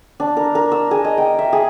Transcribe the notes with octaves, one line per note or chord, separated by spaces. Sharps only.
D4
A#4
A#4
E6
G#4
D#5
G5
E5
G#4